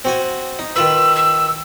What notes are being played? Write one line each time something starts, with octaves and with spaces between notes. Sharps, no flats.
C4 F#4 G#5
D#4
D#3 F4 B4 E6
E6